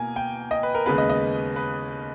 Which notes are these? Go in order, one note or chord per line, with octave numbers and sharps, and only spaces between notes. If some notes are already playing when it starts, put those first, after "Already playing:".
Already playing: B2 A#3 G#5
G5
D#5
B4
A#4
D#2 C#3 G#3 B3 B4
D#5
D#5
B4